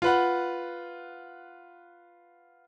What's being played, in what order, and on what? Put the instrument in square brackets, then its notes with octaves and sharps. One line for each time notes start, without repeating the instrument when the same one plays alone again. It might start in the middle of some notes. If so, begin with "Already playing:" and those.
[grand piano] F4 B4 F#5